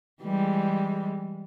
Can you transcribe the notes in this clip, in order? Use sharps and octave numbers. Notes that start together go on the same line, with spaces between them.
E3 G3 G#3